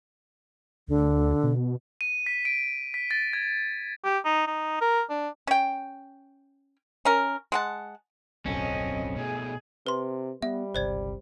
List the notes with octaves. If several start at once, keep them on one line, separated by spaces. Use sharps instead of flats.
D2 D3
B2
D#7
B6
D7
B6
A6
G#6
G4
D#4
D#4
A#4
D4
C#4 G5
C#4 A#4
G#3 F#5 A5
D1 B1 F#2 C4 C#4 A4 D#5
B2 A3 G#4
C3 B4 C6
G3 B3 E5
G1 C#2 C3 C5 D5 G#6